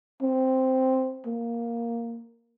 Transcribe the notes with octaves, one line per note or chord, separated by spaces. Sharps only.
C4
A#3